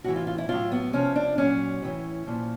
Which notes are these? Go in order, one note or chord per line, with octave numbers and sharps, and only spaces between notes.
A2 E3 F#4
F4
F4
E4
A2 F#3 F4
B3
C3 F3 C#4
D4
A#2 F#3 C#4
A2 E3
A#2 F3